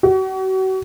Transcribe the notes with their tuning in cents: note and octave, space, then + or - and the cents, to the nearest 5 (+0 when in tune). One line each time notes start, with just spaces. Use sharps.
F#4 +40